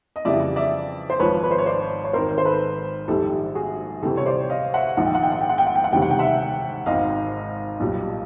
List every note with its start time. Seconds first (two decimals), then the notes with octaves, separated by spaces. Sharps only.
0.16 D#5
0.25 F2 C#3 E3 G3 D5 E5
0.56 D5 E5
1.10 C5
1.19 G#1 G#2 F3 B4 C#5
1.43 B4
1.51 C5
1.58 C#5
1.66 C5 D5
2.04 C#5
2.13 G#1 G#2 D#3 A#4 C5
2.38 C5
2.45 A4 B4
3.08 A#1 G#2 D#3 G3 G4 A4
3.55 F#4 G#4
4.02 D2 C3 E3 G3 G4 A4
4.17 C#5
4.26 C5 D5
4.50 D#5 F5
4.74 E5 F#5
4.97 A#1 G#2 D#3 F#5
5.06 G5
5.15 F#5
5.23 G5
5.32 F#5
5.41 G5
5.49 F#5
5.58 G5
5.67 F#5
5.75 G5
5.84 F#5
5.92 E1 D2 C3 D#3 G3 G5
6.02 F#5
6.11 G5
6.19 E5 F#5
6.86 G#1 G#2 D#3 D#5 F5
7.80 B1 A#2 G3